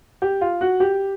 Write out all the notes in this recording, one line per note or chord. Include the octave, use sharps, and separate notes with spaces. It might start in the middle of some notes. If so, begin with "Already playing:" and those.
G4
F4
F#4
G4